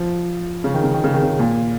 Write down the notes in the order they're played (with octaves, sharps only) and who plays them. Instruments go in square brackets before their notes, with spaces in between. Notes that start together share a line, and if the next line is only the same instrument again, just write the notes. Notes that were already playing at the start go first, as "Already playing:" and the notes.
Already playing: [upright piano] F3
C#3
D#3
C#3
D#3
C#3
D#3
C#3
A#2